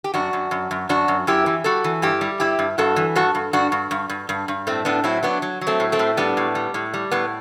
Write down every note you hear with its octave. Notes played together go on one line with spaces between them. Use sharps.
G4
F#2 D4 F#4
F#2
F#2
F#2
F#2 D4 F#4
F#2
F#2 E4 G4
E3
G3 F#4 A4
E3
G2 E4 G4
G3
G2 E4 G4
G2
G2 F#4 A4
E3
G2 F#4 A4
G2
G2 D4 F#4
G2
G2
G2
G2
G2
A2 A3 C4
A2 B3 D4
F#3 C4 E4
F#3 B3 D4
F#3
F#3
A3 C4
A2
A3 C4
A2
G3 B3 D4
A2
G3
A2
G3
A2 B3